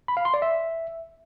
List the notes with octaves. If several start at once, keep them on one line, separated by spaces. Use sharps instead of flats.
B5
F5
C6
D5
E5